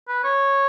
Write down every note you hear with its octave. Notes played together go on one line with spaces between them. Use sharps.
B4
C#5